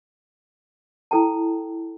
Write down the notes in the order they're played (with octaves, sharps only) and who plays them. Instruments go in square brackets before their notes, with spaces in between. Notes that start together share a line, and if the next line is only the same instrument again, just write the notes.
[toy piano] E4 A4 G5 A5